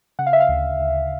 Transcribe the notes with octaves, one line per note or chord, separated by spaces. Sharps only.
C#3 F#5
F5
E5
F5
D2
D2